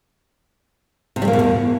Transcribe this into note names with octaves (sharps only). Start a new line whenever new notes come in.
C3
G3
A#3
B2
E2